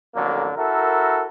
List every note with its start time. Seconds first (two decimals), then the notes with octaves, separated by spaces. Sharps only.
0.15 A1 F2 D3 F#3 A#3
0.57 E4 F#4 A4 A#4